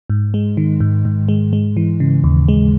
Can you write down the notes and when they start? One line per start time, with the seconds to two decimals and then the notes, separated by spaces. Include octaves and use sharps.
0.10 G#2
0.34 G#3
0.57 D#3
0.80 G#2
1.05 G#2
1.28 G#3
1.53 G#3
1.77 E3
2.00 C#3
2.24 D#2
2.48 G#3